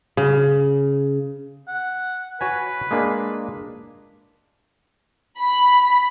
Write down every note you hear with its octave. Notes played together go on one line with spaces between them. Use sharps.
C#3
F#5
F#4 B4 C#5 G#5
G#3 A#3 D4
B5